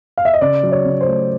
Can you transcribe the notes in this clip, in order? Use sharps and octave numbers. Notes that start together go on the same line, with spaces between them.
F5
E5
D#5
C#3 D5
F#3
C#5
C#3
C5
A3